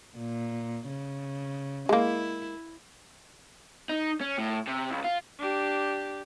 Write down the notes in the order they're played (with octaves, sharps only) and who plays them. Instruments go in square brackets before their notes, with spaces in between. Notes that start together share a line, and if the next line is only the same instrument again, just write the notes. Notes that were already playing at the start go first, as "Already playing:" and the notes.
[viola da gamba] A#2
C#3
[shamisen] G#3 A#3 [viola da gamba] E4
[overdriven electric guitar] D#4
C#4
A2
C3
C#2
F4
[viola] D4 G4